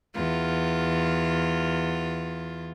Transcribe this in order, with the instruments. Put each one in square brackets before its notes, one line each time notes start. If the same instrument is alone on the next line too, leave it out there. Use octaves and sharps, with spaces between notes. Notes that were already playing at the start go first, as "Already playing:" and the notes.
[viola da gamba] E2 F4